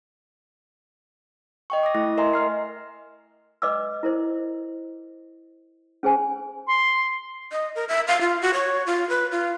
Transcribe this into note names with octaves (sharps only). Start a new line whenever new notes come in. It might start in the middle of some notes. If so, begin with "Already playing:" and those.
D#5 G5 C#6
D6 D#6 A#6
A3 E4 A#6
A#4 D#5 E5 G#5 A#5 C6
D#5 F6 C7
B4 D#5 D6 E6
E4 A#4 C5 D#5
C#4 G#4 C5 G#5
C6
D#5
A#4
E5
F5
F4
F#4
C#5
F4
B4
F4